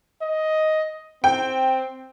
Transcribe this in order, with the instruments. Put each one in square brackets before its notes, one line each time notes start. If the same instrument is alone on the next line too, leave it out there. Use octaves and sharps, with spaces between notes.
[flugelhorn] D#5
[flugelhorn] C4 [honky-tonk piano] G5